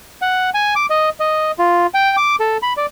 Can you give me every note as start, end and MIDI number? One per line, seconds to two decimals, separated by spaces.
0.22 0.50 78
0.54 0.74 80
0.76 0.86 86
0.90 1.09 75
1.20 1.52 75
1.59 1.87 65
1.94 2.16 79
2.17 2.36 86
2.40 2.57 69
2.62 2.73 83
2.77 2.86 74